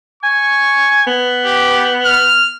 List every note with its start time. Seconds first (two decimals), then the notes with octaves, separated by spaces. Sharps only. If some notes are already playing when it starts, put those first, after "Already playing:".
0.23 G#5 C#6
1.07 B3
1.45 G4
2.05 F6